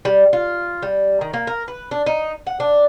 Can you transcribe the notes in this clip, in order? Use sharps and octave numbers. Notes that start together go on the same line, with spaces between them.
G3
F4
G3
D#3
A#3
A#4
B4
D4
D#4
F#5
D4